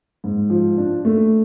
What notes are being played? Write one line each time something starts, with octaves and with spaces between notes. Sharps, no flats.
G#2
F3
D4
A3